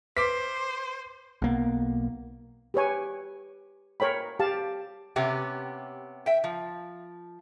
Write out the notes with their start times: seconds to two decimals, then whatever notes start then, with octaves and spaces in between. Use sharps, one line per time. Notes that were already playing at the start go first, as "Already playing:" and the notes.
0.17 B4 C5 D6 B6
1.42 B1 A#3 B3
2.74 G4 B4 C#5 G#5
4.00 A#4 C#5 G5 B5
4.39 G4 F5 A5
5.16 C3 B3 C#4 G4
6.26 E5 G5
6.44 F3